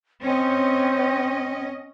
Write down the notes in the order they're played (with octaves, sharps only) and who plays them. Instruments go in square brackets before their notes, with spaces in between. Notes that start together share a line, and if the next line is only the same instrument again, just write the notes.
[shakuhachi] C4 [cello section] C#4 D#5